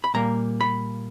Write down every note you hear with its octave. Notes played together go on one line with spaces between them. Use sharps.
B5
A#2 G3 A#3 A#5
B5